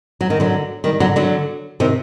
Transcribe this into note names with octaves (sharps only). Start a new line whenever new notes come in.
F#3
D#3
D3 F#3
D#3 G3
D3 F#3
D3 F#3
C3 D#3